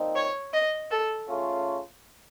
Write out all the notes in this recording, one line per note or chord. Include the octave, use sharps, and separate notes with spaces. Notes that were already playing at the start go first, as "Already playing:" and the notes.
Already playing: A#2 F3 C4 D#4
C#5
D#5
A4
C#3 A3 C#4 F4